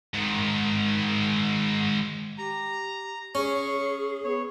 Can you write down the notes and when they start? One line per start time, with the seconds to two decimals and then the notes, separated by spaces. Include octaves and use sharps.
0.14 G#2 D#3
2.38 G4 A#5
3.35 C#4 G#4 C#5 C#6
4.24 B3 C#5